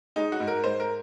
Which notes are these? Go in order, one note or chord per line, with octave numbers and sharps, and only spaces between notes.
G#3 D#4
F#4
G#2
A#4
G#2 C5
A#4